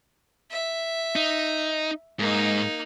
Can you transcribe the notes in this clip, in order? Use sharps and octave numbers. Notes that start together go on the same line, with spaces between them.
E5
D#4
G#2 A#3 D#4